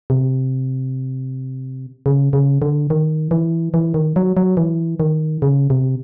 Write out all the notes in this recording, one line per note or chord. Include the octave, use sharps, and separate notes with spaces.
C3
C#3
C#3
D3
D#3
E3
E3
D#3
F#3
F#3
E3
D#3
C#3
C3